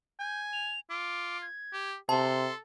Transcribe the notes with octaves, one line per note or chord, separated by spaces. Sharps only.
G#5 G6
F7
F4 D6
G#6
G4
C3 A4 A5 C6